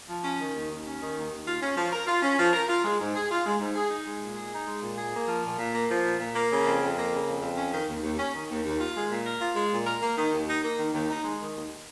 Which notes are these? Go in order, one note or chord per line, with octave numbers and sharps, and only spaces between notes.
F3
C#4
D#3
D#2
D#2
C#4
D#3
D#2
D#2
F4
C#4
F3
A#4
F4
C#4
F3
A#4
F4
G#3
G#2
G#4
F4
G#3
G#2
G#4
D#4
G#3
A#2
G#4
D#4
G#3
A#2
G#4
A#3
F3
A#2
A#2
A#3
F3
A#2
A#2
A#3
C#3
F2
F2
A#3
C#3
F2
F2
C#4
D#3
D#2
D#2
C#4
D#3
D#2
D#2
F4
G#3
A#2
A#4
F4
G#3
A#2
A#4
A#3
D#3
D#2
D#4
A#3
D#3
D#2
D#4
G#3
D#3
D#2